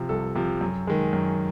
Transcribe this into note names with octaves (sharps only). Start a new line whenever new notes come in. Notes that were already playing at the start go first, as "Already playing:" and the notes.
Already playing: C3 F3
C2 A4
C3 F3
F#2
D#3 G#3
F#2